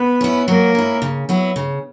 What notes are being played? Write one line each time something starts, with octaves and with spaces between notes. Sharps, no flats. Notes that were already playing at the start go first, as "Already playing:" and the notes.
Already playing: B3 B4
C#4 E4
F#3 A#3 A#4
C#4 E4
C#3
F#3 B3 E4
C#3